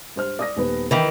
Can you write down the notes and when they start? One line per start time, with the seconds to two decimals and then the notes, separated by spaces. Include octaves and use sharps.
0.16 G2 C5 F6
0.39 D5 D#6 A#6
0.56 D#1 B3 B4
0.91 D#3 E3 E5 G5